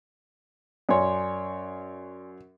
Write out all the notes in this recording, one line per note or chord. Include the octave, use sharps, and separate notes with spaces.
F#2 C#5 D5 G#5 C6